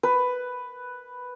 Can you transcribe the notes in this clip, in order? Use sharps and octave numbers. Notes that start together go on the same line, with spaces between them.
B4